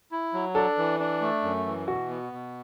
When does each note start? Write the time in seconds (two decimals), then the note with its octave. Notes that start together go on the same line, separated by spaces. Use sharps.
0.12 E4
0.34 F#3
0.55 D4 A4
0.78 E3
1.00 D4
1.21 A3
1.43 F#2
1.66 E3
1.88 B2 F#4
2.10 B3
2.32 B2